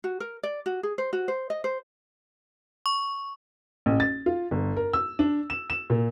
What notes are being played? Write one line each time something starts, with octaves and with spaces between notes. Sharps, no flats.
F#4
A#4
D5
F#4
G#4
C5
F#4
C5
D#5
C5
C#6
A1
A6
F4
G1
A#4
E6
D4
E7
E7
A#2